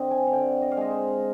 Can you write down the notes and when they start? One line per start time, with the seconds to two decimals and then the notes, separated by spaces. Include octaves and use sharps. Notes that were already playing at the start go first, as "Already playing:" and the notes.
Already playing: D3 C4 D#5
0.11 G#5
0.27 F5
0.32 D3 G5
0.61 D#5
0.72 F5
0.77 G#3 D#5
0.91 C5